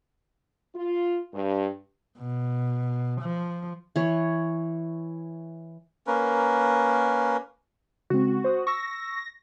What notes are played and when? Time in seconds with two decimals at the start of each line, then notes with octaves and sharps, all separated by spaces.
0.75 F4
1.34 G2
2.19 B2
3.21 F3
3.96 E3 C#5
6.07 A#3 C#4 A#4 B4
8.10 C#3 G#3 C4 F#4
8.44 C5 D#6
8.67 C#6 E6 A#6